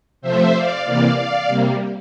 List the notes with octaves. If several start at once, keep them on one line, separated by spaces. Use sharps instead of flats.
C3 F3 A3 C5 E5
D5 F5
C3 E3 A#3 D5 F5
D5 F5
C3 G3 A#3